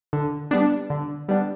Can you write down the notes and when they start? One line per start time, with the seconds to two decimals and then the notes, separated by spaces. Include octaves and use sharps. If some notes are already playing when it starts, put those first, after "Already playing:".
0.13 D3
0.51 G3 B3 D4
0.90 D3
1.29 G3 B3 D4